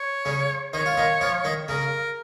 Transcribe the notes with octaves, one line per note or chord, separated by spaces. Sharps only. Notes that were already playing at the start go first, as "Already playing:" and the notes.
Already playing: C#5
C#3 C#4
D#3 D#4 C#5
F4
D#3 D#4
F3 F4
D#3 D#4
C#3 C#4 A#4